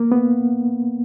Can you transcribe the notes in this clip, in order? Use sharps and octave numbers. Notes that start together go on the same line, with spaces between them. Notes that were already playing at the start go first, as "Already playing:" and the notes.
Already playing: A#3
B3